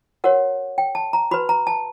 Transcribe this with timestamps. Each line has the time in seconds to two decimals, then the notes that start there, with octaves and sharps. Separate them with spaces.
0.24 F#4 A#4 C#5 F#5
0.78 G5
0.95 A5
1.13 A#5
1.31 F#4 B4 B5
1.49 A#5
1.67 A5